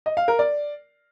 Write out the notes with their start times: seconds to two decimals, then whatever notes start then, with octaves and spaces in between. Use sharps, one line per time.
0.06 D#5
0.17 F5
0.28 A#4
0.39 D5